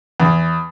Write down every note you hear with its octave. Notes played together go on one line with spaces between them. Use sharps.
E2